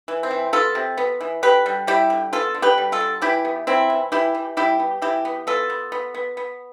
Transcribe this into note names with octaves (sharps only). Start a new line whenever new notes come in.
E3
C4
E3
B3 F4 A4
C3
B3
E3
D3 G4 B4
G3
G3 E4 G4
D3
B3 F4 A4
D3
G4 B4
G3
F4 A4
D3
E3 E4 G4
B3
E3 C4 E4
E3
E3 E4 G4
E3
G3 E4 G4
B3
E3 E4 G4
B3
B3 F4 A4
B3
B3
B3
B3